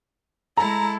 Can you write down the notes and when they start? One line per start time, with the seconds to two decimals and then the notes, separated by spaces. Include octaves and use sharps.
0.57 G#3 E4 A4 A#5